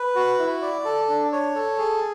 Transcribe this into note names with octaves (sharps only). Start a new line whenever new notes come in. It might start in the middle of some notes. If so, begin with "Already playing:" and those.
Already playing: B4
F#4
E4
D5
A4
D4
C#5
A4
G#4